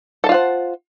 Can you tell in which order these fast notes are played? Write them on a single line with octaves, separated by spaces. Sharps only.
A4 A5 F4 F#5 C5